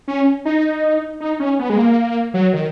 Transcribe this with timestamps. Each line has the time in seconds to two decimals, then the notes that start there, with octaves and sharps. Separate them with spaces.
0.08 C#4
0.45 D#4
1.20 D#4
1.40 C#4
1.59 B3
1.70 G#3
1.78 A#3
2.34 F#3
2.53 D#3